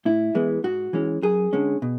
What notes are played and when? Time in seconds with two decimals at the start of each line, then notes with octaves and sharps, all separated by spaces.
0.05 A2 E4
0.35 E3 G#3 B3
0.64 G#2 F#4
0.93 E3 G#3 C#4
1.22 F#2 G#4
1.53 D3 G#3 C#4
1.82 B2